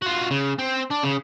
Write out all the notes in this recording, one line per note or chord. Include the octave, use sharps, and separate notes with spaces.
F4 F#4
C#3
C4
D4
C#3